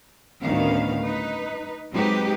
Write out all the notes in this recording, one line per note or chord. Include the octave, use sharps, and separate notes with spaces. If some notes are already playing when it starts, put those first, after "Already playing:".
D2 A2 D#3 B3 C#4 F5
D#4 B4
F#3 G#3 C4 D#4 G4 B4